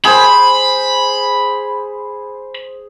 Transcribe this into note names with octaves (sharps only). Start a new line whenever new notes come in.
G#4 C5 B5